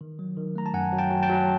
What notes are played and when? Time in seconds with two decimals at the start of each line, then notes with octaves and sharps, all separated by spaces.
0.01 D#3
0.19 F#3
0.37 D#3
0.55 A3 A#5
0.66 A5
0.73 F#2 F#5 G#5
0.92 F#3
0.98 G5 A5
1.10 F#3
1.23 G5 A5
1.29 F#3